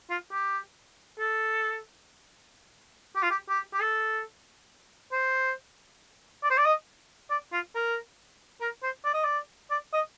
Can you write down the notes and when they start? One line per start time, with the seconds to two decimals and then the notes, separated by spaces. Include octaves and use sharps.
0.10 F4
0.32 G4
1.19 A4
3.16 G4
3.23 F4
3.30 G4
3.49 G4
3.73 G4
3.81 A4
5.12 C5
6.43 D5
6.50 C5
6.57 D5
6.65 D#5
7.30 D5
7.52 F4
7.75 A#4
8.61 A#4
8.83 C5
9.05 D5
9.14 D#5
9.24 D5
9.70 D5
9.93 D#5